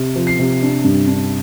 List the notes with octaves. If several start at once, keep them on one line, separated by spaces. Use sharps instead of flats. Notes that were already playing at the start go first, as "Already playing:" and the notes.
Already playing: C3
F3
C7
C3
D4
G2
D4